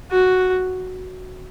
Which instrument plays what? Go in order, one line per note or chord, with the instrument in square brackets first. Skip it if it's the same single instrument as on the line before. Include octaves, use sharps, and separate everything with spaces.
[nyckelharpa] F#4